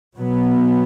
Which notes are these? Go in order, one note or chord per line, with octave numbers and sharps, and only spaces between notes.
B2 F#3 B3